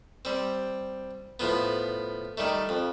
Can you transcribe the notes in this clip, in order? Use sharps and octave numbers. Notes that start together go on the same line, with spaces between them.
G3 C4
A2 F3 B3
D#3 G3 A3
F2